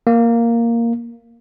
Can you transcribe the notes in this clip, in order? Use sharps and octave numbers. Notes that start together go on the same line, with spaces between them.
A#3